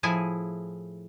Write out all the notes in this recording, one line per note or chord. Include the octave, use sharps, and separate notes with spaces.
A2 F3 E4 G#4 G#5